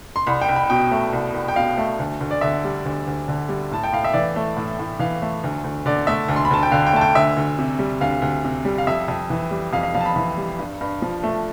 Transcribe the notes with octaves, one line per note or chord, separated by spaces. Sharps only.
C6
C2 B5
G5
C2
B5
B2 G5
A3
C2
C2
G5
B2 F5
A3
D2
D2
D5
D3 E5
G3
D2
D2
D3
G3
A2 A5
G5
A2 F5
E5
E3 D5
A3
A2
A2
E3 F5
A3
D2
D2
D3 D5
A3 E5
D2
C6
B5
D2 A5
G5
D3 F5
G5
A3 A5
G5
D2 E5
D2
C3
G3
D2 F5
D2
C3
G3
F5
F2 E5
F2
E3
G3
F2 F5
F5
F2 F5
A5
B5
E3 B5
G3
G2
G2
F3
A3